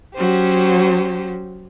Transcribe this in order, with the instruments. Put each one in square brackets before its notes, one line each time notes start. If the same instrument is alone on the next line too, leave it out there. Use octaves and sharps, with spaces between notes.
[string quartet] F#3 C#4 F#4 G4 C5